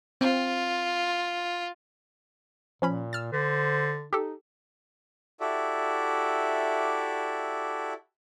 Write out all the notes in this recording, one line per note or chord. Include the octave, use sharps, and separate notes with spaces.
C4 F4
A#2 F3 C#4 B5
E6 F6 A6
D3 C5
D#4 G4 A4
E4 F#4 G4 A4 D5 E5